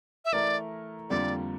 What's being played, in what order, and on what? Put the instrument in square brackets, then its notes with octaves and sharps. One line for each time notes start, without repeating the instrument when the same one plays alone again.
[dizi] E5
[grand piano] E3 A3 E4 A#4 [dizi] D5
[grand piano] F2 D3 G3 A#3 F4 [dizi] D5